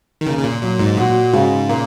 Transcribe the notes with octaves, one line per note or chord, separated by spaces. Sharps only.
D#3
C#3 A#3
C#3
A#2
A#2 F#3
G#2
A#2 F#4
G#2 C#3
A#2 A#3